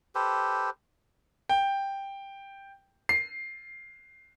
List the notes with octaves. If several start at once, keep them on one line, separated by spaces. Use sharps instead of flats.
G4 A4 B4 C5
G5
C7